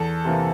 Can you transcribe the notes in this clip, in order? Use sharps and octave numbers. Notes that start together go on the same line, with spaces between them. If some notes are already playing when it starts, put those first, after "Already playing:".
Already playing: E2 A4
C3 E3 A#3